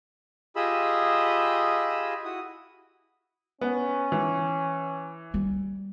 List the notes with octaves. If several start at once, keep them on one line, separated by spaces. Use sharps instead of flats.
F4 G4 G#4 D#5 B5 E6
E4 F#4 D#6
B3 C#4
E3
G3